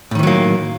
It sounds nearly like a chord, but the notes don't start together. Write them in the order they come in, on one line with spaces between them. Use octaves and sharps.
A2 D#3 E3 F#3 A#3